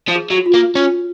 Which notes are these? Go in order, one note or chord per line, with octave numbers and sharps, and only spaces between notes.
F3
G#4
F#3
F#4
F4
A#3
C#4 F4